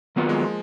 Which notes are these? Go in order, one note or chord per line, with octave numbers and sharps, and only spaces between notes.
D#3 F#3 A#3 B3 F4 B4
G#3
F3